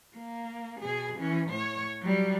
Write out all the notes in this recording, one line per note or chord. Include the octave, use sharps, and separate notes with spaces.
A#3
B2 G#4
E3 C#4
A2 C#5
F#3 G3